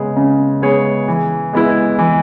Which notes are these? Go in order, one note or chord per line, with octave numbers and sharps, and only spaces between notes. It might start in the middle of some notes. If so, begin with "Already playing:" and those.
Already playing: C#3 G#3 B3 G#4
C#3
G#3 B3 G#4 C#5
E3
G#3 B3 E4
E3